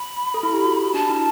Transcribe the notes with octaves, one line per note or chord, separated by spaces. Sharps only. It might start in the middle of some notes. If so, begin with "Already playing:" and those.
Already playing: B5
A4
E4
G4
F#4
D4 A5
E4